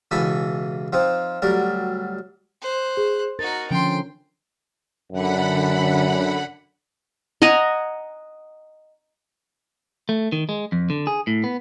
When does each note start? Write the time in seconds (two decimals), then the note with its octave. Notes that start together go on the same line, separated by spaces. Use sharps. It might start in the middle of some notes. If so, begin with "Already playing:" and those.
0.11 C#2 B2 E3 A4 G#5 B5
0.93 F3 C4 D#4
1.42 D2 F#3 G3 A#4
2.61 C5 F#6
2.97 G#4
3.39 D#4 F#4 A#4 A6
3.71 D3 F3 C#4 G5 C6
5.12 F#2 D3 F#5 B5
7.42 D#5 F#5 G#5 A#5
10.09 A3
10.32 D#3
10.49 G#3
10.72 F2
10.90 D3
11.07 G#4
11.27 A2
11.44 B3